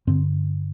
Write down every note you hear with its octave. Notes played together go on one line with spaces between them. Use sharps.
G2 D3 C4